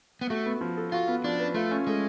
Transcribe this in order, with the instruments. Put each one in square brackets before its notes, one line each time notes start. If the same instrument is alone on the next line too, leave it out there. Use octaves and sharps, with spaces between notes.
[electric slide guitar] B3
[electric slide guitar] A3 [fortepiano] F#4
[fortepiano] B3
F3
A4
[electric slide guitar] F4 [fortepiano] F#4
[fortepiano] B3
[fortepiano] F3 [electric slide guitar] D4
[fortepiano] B4
[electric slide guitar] A3 [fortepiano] F4
[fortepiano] C#4
[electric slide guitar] G#3 [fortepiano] A3